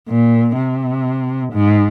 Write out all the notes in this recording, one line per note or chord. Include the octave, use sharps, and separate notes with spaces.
A#2
C3
G#2